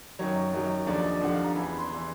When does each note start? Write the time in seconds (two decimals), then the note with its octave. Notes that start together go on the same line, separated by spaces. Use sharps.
0.19 F#2 D#3 F#3 C#5
0.53 F#2 D#3 F#3
0.87 D#2 D3 F3 D5
0.98 D5
1.04 D#5
1.21 D#2 D3 F3 F#5
1.33 F5
1.44 A#5
1.55 E2 C#3 E3 B5
1.67 B5
1.78 C6
1.90 C#3 E3 C6